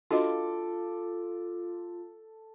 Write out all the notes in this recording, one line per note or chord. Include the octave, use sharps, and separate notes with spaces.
D4 F4 F#4 A4 D#5 D6